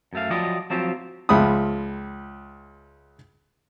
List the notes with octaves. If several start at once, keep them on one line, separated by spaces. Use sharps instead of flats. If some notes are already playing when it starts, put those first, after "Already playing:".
F#2 A3 F5
F3 F#3 F4 G4 D5 D#5
F3 F#3 C4 F4 G4
C#2 F3 E5 B5 D#6